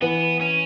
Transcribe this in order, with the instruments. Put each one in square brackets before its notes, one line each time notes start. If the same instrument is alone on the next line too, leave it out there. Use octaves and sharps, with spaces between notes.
[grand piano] E3 [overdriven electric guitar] B3
[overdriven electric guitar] C#4